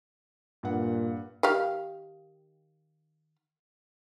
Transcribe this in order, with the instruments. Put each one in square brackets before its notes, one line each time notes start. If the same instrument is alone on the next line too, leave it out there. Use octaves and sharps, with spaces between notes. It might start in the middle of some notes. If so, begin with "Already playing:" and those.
[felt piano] G2 F#5 [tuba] A#2
[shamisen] D#3 G4 F5